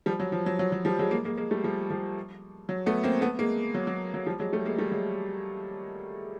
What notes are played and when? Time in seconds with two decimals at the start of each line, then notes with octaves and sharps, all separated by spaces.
0.06 F3 G3
0.20 F#3
0.32 F3
0.46 F#3
0.59 F#3
0.72 F#3
0.85 F3 G3
0.99 F#3 G#3
1.11 G#3 A#3
1.25 G#3 A#3
1.37 G#3 A#3
1.51 G3 A3
1.64 F3 G3
1.90 F3 G3
2.69 F#3
2.86 A3 B3
3.03 A#3 C4
3.21 A3 B3
3.39 G#3 A#3
3.74 F#3
3.87 F#3
4.14 F#3
4.26 F3 G3
4.39 F#3 G#3
4.53 G3 A3
4.66 G#3 A#3
4.78 G3 A3
4.92 F#3 G#3